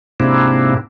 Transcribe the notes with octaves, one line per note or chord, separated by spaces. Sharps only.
G#2 C3 A#3 C4 D4 E4